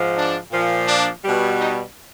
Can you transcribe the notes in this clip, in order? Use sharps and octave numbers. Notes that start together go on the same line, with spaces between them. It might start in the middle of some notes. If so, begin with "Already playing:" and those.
Already playing: G#2 F3
D4
A#2 F3
D4
B2 G3
D#4